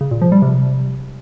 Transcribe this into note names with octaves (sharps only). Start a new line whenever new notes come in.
C#3
A#2
F3
G3
C3